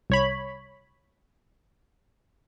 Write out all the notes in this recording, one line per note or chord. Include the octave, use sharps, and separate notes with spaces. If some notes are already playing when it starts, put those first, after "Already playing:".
C2 C#5 B5